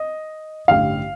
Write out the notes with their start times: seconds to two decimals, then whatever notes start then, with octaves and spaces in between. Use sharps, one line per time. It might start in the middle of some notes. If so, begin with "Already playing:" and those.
Already playing: D#5
0.68 A1 G2 D3 F5